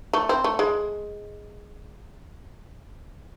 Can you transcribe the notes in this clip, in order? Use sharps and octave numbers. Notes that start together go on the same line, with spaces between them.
A3
C4
A3
G#3